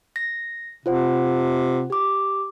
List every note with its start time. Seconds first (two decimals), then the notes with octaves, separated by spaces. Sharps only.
0.16 A#6
0.86 C3 F4 C5 F#5
1.90 G4 D6